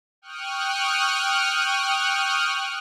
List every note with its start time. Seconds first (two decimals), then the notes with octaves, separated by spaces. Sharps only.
0.22 G5 C#6 D#6 F6 F#6